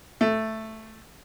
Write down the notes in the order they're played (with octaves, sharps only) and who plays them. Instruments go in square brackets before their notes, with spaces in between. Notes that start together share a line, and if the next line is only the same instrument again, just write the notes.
[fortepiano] A3